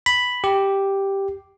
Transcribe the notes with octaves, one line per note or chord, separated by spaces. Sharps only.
B5
G4